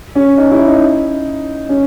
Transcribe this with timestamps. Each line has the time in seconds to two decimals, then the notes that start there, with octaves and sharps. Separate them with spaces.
0.15 C#4
0.38 D#4
0.52 E4
0.67 D#4
1.69 C#4